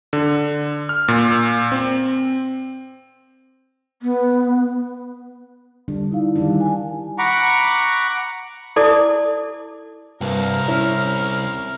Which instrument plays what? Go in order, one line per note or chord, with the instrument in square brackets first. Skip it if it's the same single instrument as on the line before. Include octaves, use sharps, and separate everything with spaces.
[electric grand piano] D3
F6
A#2
C4
[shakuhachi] B3
[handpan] D3 G3 D4
[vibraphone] D#4 E4 F5
[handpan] D#3 G3 D4
[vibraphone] G#5
[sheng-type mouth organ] F#5 A#5 B5 C#6 D6
[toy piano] E4 A4 D5 A5 D6 D#6
[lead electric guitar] C2 [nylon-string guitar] G2 [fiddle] A#4 F6
[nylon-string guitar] C#4 E4